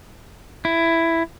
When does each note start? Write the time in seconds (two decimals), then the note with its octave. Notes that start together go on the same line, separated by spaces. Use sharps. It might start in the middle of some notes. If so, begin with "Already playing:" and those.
0.65 E4